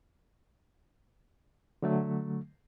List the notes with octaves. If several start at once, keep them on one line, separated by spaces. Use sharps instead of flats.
D3 F#3 A3